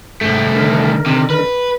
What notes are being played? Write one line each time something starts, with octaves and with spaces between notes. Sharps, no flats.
C2 G#2 A3 G5
D3 D#3 A#4
C3
B4